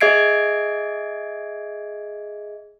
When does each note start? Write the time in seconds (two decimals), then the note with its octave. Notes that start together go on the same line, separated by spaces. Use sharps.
0.01 G#4 D#5 E5 G#6 C7 D7